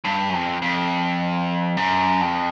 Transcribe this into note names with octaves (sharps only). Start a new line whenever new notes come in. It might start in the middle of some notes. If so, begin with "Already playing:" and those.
G2
F#2
F2
F2
F#2
F2